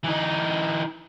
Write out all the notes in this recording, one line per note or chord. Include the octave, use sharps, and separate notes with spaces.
E3 D#4